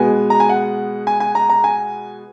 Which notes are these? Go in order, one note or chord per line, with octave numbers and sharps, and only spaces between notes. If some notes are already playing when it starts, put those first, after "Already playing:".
Already playing: B2 G#3 B3 G#5
A#5
G#5
F#5
G#5
G#5
A#5
A#5
G#5